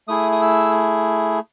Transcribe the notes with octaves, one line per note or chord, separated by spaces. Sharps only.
A3 E4 G#4 D#6
D#6
E6